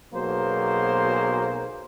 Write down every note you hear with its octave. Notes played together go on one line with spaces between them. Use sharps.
B1 B2 F#3 A#3 G#4 C5